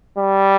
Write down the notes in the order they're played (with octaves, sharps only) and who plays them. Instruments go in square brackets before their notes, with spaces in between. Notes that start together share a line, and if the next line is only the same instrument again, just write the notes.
[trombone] G3